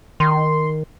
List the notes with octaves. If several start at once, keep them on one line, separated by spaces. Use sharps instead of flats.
D#3 C6